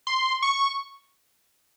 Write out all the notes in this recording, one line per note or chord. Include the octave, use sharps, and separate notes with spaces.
C6
C#6